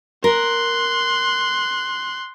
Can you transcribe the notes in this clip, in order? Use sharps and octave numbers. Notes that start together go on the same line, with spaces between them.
A#4 C6 F#6